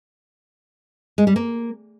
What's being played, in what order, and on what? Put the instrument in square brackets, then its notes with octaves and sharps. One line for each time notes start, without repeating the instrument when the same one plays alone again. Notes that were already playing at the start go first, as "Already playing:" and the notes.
[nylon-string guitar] G#3
G3
A#3